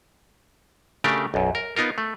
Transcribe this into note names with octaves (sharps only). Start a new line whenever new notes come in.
C#3 A3 D4 G4 A#4
B1 F#2
A#4
B3 D#4 F4 A#4
A3